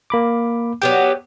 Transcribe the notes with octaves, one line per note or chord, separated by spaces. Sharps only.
A#3 B5 D6
F#3 B3 G4 G5